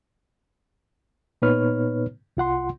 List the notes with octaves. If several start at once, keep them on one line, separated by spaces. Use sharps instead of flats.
A#2 B3 D#4 B4 C#5 F6
C2 F4 F#5 C6